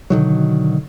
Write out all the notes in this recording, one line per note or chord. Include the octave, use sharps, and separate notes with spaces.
B2 D3 D#3 F#3